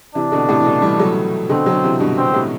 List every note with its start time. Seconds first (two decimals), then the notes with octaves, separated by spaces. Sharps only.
0.15 C3 E3 D4
0.32 B2 D3
0.49 A2 C3
0.60 E3
0.65 B2 D3
0.82 E3 G3
0.99 F#3 A3
1.49 B2 D3 C4
1.66 D3 F#3
1.84 C3 E3
2.00 G2 B2
2.18 G2 B2 C4
2.34 A2 C3